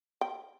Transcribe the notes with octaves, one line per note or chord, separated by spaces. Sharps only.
G5